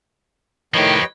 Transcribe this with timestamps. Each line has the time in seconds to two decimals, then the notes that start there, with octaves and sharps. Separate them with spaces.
0.74 A2 D#3 F3 G4 B4 C#5 D#5